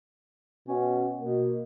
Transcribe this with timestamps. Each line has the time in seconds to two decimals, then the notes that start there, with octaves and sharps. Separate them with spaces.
0.68 B2 C#4
1.20 B2 A#3